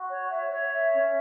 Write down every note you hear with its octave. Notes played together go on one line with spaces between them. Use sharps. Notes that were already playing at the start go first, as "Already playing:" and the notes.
Already playing: F#4
C#5
E5
C#5
E5
C#4